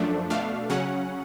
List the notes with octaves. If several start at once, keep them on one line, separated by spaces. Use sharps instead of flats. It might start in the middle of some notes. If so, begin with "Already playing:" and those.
Already playing: F#2 F3 A3 D4
B2 A3 D4 F5
C#3 F#3 C#4 F#5